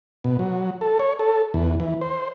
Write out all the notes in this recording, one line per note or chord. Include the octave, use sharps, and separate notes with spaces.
B2
F#3
A4
C#5
A4
E2
E3
C5